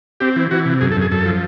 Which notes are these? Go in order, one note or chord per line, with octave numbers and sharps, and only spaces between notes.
C4 G4
E3
E3 F#4
C3
F#2 G#4
A4
F#2 G#4
F#2 A4
F3